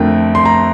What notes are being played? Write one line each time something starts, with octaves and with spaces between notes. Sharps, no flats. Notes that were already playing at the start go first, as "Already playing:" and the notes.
Already playing: F2 D3 A3 C4 A#4 G5
C6
A#5